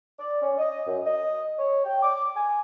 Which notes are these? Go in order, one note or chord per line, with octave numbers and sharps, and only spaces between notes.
D5
C#4
D#5
F#2
D#5
C#5
G5
D6
G#5